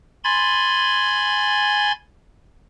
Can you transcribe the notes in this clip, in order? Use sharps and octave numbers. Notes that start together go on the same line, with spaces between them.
G#5 B5 C6 G#6 A6